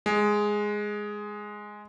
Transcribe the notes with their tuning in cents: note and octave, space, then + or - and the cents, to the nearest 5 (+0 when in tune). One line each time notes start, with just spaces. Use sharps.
G#3 +0